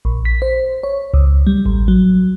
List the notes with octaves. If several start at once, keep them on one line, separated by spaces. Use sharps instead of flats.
A#1
B6
C5
C#5
C#2
G3
A1
F#3